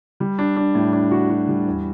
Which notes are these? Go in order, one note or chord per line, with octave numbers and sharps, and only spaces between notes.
G3
D4
D4
A2
D4
F#4
F#4
G3
E2